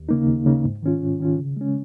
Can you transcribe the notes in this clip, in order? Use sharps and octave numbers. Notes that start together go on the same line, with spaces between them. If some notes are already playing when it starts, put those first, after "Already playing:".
Already playing: D#2
C#3 A#3 D#4
D#2
C#3 A#3 D#4
G#2
D#3 C#4 F4
G#2
D#3 C#4 F4
C#3
G#3 C#4